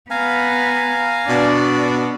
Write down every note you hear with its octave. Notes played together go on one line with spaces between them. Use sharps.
B3 F5 G#5 A#5
B2 D4 D5